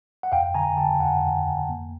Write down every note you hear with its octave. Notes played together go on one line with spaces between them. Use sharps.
F#5
F2 F5 G5
D3 G#5 A#5
D3 G5 A5
F2 F#5 G#5
F2
F2
A#3